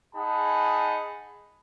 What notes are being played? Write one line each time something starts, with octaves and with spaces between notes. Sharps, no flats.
D#4 G#4 F#5 G#5 A5 B5